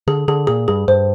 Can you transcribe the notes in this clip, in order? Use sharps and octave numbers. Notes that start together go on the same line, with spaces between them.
D3 G#4
D3 G#4
A#2 G#4
G2 G#4
G2 C5